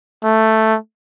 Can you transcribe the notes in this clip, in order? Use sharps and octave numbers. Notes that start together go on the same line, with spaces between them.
A3